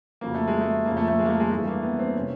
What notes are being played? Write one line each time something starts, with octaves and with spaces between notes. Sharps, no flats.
F2 C#3 F#3 A#3
A3
G#3
A3
F2 C#3 F3 A#3
A3
A3
G#3
A#3
A3
G#3
G2 E3 A3
A#3
B3
C4
C3 D#3 C#4